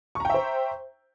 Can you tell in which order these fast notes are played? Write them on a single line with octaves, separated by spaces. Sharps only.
C#6 A#5 G5 E5 C5